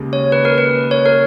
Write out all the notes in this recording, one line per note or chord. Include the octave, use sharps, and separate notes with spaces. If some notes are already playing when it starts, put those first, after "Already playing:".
Already playing: D#2 C#3 G#3
C#5
B4
A#4
B4
C#5
A#4